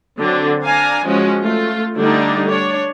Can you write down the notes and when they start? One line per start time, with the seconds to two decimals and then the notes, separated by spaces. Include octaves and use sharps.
0.18 D3 F#3 C4 D4
0.64 D4 F5 G#5 A#5
1.04 F3 G#3 C#4 F#4
1.42 A3 F4
1.97 D3 G3 A3 D4 D#4
2.49 D4 C#5